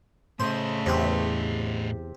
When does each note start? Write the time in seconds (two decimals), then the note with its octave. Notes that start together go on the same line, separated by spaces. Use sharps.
0.40 A2 C#3 A3 C5 D#5
0.86 E2 C3 C4